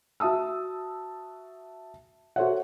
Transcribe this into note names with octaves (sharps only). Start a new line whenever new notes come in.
F#4 E5 A5 D#6 E6
F#4 A4 C5 C#5 E5 F#5